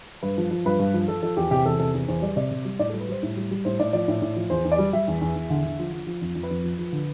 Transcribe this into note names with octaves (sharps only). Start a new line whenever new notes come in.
G2 B4
F3
F3
G2 B4
G2
F3
F3 A4
F3 A4
E2 G4
C3 G4
E2 A4
C3 A4
E2
E2 C5
G3 D5
C3 D5
C3
G3
A2 D5
A4
G3
B4
G3 C5
A2
G3
G3
A2 C5
A2 D5
F3 D5
A2
A2
F3
E2 C5
E2
D5
G3
G3 E5
E2
E2
E2
D3
D3
F3
F3
F3
F2
F2
B4
F2
F3
F3
D3